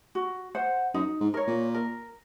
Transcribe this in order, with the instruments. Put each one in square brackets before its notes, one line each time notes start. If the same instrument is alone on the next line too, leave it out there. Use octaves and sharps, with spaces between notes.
[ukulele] F#4
C5 F#5
[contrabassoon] F#2 [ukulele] D#4
[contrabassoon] G#2
[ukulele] A#4 C#5
[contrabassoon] A#2
[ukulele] A#4